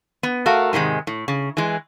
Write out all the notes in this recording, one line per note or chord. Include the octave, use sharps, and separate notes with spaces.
B3
A3 F#4 A#4 F5
G#2 C3 D#3 G#3
A2
C#3
E3 G#3